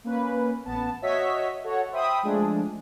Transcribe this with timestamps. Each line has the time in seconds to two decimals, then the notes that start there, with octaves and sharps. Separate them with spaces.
0.04 A#3 C#4 B4
0.66 A1 B3 A5
1.02 F#4 C#5 D#5 E5 B6
1.63 F#4 A4 C#5 F#5
1.92 C5 E5 G5 B5 D#6
2.23 F3 G#3 A3 D4 G#4